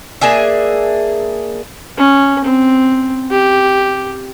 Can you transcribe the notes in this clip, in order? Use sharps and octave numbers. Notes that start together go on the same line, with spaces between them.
A#3 D4 G#4 E5
C#4
C4
G4